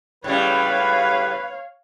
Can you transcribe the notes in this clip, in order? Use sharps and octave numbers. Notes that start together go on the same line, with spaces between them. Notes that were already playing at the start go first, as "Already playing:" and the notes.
A2 C#3 G3 B4 C#5 F5